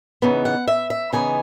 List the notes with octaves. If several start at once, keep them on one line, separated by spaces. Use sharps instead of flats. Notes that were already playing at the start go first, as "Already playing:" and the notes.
C#3 E3 B3 D#4
F#5
E5
E5
C#3 E3 B3 D#4 G#5